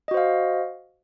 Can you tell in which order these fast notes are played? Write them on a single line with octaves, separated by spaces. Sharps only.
D#5 F#4 C5 F5